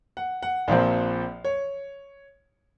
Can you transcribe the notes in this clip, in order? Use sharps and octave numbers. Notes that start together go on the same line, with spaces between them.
F#5
F#5
A#1 A#2 F3 C4 F5
C#5